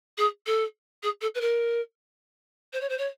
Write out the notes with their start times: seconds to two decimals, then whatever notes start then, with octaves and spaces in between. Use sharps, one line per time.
0.18 G#4
0.46 A4
1.03 G#4
1.21 A4
1.35 B4
1.41 A#4
2.73 C5
2.81 C#5
2.89 C5
2.98 C#5